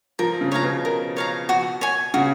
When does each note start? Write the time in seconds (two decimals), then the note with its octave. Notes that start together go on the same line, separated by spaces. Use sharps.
0.19 F3 A#4
0.41 C#3
0.52 C#3 C#5 F5 A#5
0.63 B2
0.85 A#4
1.17 C#5 F5 A#5
1.49 F#4
1.81 C#5 G#5
2.14 C#3 F#4